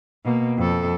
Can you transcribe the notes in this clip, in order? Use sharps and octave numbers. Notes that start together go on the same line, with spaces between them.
B2 A#3
F2 A4